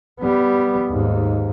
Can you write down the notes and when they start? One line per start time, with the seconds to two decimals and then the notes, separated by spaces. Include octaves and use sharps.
0.20 G3 B3
0.89 D#2 G#2